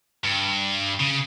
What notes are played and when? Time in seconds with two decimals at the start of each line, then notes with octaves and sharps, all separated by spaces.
0.24 G2
1.00 C#3